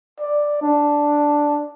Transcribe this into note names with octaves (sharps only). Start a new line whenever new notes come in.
D5
D4